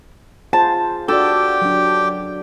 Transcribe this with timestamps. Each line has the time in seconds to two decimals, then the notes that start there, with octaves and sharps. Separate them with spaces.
0.53 F4 G#4 C5 A5
1.08 D4 F#4 G4 A4 D5 G5
1.62 F#3 D4